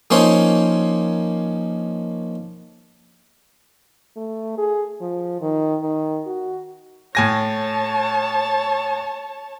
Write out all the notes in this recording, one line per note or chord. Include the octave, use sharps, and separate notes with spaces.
F3 A#3 C#4 D#4 C5 C#5
A3
G#4
F3
D#3
D#3
F#4
A2 C#5 G#5 A5 A#6